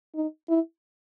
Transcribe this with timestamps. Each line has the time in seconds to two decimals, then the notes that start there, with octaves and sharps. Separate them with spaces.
0.15 D#4
0.49 E4